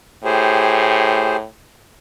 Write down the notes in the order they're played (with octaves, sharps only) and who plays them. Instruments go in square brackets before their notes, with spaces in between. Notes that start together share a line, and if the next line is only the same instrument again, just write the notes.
[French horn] A2 [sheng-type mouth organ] G4 G#4 C5